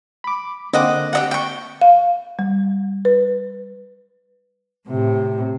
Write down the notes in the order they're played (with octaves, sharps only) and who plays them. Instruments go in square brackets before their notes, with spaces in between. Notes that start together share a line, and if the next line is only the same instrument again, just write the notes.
[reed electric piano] B5 D6
[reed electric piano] D3 A#3 C4 [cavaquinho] D#5 F#5 D6
[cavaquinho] G4 D#5 F#5
G5 C#6
[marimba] F5
G3
B4
[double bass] A2 C3